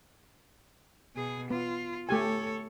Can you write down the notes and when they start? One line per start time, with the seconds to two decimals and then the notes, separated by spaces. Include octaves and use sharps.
1.16 B2 G#4
1.50 B3 F4
2.09 A3 G4 A4 C#5 G#5